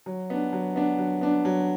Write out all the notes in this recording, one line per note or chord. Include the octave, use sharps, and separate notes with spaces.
F#3
B3 D4
F#3
B3 D4
F#3
B3 D4
F#3